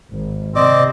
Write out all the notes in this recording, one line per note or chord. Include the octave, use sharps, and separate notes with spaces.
G#1
C3 C4 D5 D#5 D6